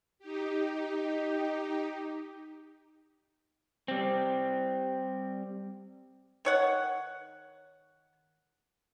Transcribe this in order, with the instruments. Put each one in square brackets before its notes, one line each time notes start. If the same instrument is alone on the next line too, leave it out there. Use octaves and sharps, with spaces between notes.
[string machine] D#4 G4
[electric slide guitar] G3 C4
[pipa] D#3 C#5 F#5